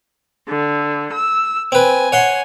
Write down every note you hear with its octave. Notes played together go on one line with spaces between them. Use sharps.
D3
E6
C4 B4 G#5
C#5 F#5 C6